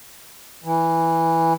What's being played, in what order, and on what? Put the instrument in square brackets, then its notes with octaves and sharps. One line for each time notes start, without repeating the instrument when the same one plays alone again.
[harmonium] E3